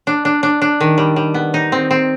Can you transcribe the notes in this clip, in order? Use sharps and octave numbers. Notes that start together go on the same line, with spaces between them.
D4
D4
D4
D4
D#3
G3
G3
B3
D#4
C4
C4